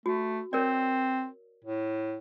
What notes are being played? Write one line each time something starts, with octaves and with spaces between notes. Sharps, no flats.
A3 F#4
C4 A#4 C#5 D5
A2